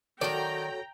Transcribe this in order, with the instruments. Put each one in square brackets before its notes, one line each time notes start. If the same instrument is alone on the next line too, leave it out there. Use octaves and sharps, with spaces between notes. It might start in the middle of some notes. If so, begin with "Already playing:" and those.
[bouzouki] D#3 F#3 [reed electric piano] F#4 A4 C#5 [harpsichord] D5 [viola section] G5 A#5